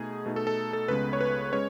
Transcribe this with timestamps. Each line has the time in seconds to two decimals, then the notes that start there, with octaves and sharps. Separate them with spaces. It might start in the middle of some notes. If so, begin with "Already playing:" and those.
Already playing: B2 A3 D#4 G#4
0.26 B2 A3 D#4
0.36 A4
0.47 A4
0.73 A4
0.88 C#2 C#3 G#3 B3 B4
1.13 C#5
1.21 B4
1.52 G#3 C#4 C#5